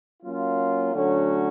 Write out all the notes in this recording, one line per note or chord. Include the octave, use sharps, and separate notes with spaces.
F#3 A#3 C#4 F4
D3 F#3 A3 C#4 F#4